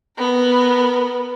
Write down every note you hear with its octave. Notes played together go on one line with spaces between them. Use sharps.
B3 A#4